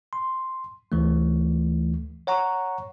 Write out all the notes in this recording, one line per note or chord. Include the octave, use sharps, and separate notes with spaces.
C6
D2 E3 A3
C#5 F#5 A#5 C#6